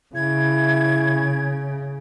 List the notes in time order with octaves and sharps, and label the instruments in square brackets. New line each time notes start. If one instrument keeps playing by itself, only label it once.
[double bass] C#3 [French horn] E4 [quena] G#6